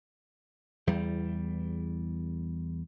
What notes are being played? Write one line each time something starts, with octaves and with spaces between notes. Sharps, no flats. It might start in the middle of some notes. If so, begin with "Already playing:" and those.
E2 G3